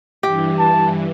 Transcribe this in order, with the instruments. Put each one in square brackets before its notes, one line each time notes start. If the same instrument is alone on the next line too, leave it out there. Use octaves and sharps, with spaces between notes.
[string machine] G2 E3 [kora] G4
[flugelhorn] A5